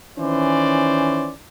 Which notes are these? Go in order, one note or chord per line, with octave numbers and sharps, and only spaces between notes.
D#3 E3 C#4 C5 D5